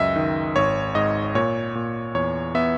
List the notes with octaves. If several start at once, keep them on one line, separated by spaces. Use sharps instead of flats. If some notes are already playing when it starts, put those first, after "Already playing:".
Already playing: C#2 F#2 D#5 E5
D#3
G#1 C#5
G#2 D#5
A#2 C#5
A#2
E2 C#5
B3 E5